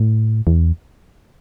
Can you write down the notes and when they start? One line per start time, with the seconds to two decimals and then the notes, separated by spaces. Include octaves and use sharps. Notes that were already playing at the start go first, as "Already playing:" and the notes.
Already playing: A2
0.47 E2